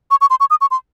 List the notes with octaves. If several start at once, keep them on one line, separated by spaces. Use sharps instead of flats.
C#6
C#6
C6
C#6
D#6
C#6
C6